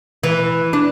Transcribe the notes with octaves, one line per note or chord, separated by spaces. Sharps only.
E3
D4